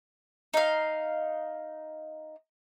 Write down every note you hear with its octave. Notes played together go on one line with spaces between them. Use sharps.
D#4 F5